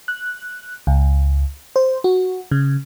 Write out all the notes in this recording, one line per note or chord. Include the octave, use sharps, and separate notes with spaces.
F#6
C#2
C5
F#4
C#3